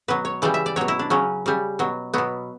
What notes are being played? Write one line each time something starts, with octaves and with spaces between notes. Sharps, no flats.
B2 F#3 B4
C#5
C#3 E3 G3 D5
E5
D5
B2 F#3 C#5
E4
D4
C#3 F#3 C#4
C#3 G3
B2 F#3
B2 F#3 B3